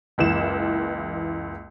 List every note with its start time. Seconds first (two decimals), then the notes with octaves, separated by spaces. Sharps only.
0.18 F#1 C#2 E3 E7